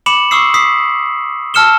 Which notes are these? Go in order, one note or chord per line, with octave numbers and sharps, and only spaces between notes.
B5 D6 C#7 E7 F#7
C#6 D#6 E6 C7
D#6 B6 C7
A5 E6 F6 C#7 E7 G7